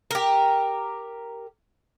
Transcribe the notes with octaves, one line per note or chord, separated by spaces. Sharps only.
G4 A#4